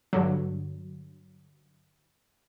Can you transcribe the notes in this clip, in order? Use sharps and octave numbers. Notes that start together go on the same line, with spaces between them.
G2 D3 F#3